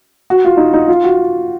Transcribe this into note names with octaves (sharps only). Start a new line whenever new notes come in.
F#4
F4
D#4
D#4
F4
F#4